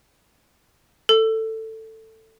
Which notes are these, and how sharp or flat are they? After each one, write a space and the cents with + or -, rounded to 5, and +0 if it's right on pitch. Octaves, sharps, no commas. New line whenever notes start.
A4 +15